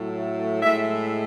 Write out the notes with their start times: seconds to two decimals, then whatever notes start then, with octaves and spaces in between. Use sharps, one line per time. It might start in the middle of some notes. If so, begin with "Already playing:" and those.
Already playing: A2 F#3 A3
0.62 A2 G#3 E5